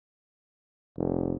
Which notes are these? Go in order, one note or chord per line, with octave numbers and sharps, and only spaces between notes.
F1